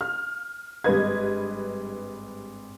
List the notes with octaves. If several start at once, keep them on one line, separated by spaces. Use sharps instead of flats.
F6
G#1 G2 G3 B4 D#5 G#6